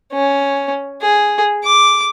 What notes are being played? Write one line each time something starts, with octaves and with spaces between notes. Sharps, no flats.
C#4
G#4
D6